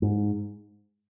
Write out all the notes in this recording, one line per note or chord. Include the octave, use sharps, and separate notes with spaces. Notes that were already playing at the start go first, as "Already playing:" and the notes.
G#2